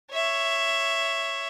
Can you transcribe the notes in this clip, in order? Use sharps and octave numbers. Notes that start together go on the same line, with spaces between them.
C#5 E5